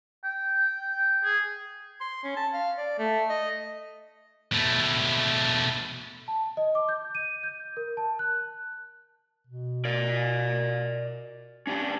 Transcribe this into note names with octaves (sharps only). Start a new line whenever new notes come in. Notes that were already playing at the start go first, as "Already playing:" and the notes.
G5
G#4
C6
C#4
A5
F5
D5
A3
D#5
B2 A3
A5
D#5
D6
G6
D#7
G6
A#4
A5
F#6
B2
A#4 D5
C#4 D4 G4